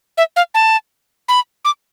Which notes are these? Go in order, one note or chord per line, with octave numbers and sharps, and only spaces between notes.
E5
F5
A5
B5
D6